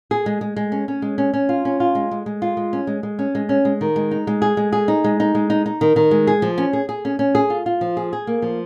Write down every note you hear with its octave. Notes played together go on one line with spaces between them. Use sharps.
G#4
G#3
G#3
G#3
C#4
C#4
G#3
C#4
C#4
F4
C#4
F4
G#3
G#3
G#3
F4
G#3
C#4
G#3
G#3
C#4
G#3
C#4
G#3
D#3
G#3
D#4
G#3
G#4
G#3
G#4
D#4
G#3
D#4
G#3
D#4
D#4
D#3
D#3
G#3
G#4
F3
C#4
G#4
G#4
C#4
C#4
G#4
F4
F4
F3
G#4
G#4
A#3
F3